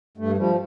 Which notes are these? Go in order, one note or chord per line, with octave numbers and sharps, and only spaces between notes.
G2 A3
F3 G3